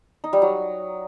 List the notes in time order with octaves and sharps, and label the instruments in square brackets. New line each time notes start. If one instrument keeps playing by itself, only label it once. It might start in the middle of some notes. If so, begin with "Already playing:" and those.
[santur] D#4
G3
F#3